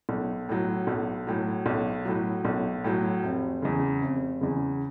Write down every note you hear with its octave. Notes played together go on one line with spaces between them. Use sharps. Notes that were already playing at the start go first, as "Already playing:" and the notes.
B1
A2 F#3
B1
A2 F#3
B1
A2 F#3
B1
A2 F#3
F1
E2 C#3
F1
E2 C#3